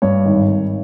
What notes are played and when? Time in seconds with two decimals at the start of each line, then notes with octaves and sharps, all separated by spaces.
0.02 G2 C#5
0.25 G#1
0.48 G#1